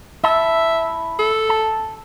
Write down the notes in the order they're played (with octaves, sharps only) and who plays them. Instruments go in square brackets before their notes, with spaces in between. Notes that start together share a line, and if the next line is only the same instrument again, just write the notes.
[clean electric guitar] E4 A5 [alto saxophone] E5
[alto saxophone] A4
[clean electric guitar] A5